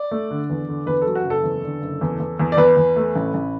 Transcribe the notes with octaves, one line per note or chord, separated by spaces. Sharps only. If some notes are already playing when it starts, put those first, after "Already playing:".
Already playing: D5
A3
D3
E2
D3
E2 B4
F#3 A4
F#4
F#1
A4
E2
D3
F#1
E2
E2
E2
D5
E2 B4
E2
A3
A1
A1